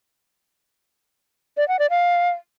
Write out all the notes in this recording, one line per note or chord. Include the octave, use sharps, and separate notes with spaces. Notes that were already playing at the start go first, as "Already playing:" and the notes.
D5
F#5
D5
F5